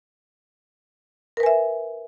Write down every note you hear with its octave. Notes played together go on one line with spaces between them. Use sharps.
A#4 B4 E5 G#5